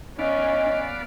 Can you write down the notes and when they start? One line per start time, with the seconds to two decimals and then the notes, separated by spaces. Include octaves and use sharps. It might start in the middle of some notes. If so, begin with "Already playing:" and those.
0.19 B3 C#4 D5 D#5 F5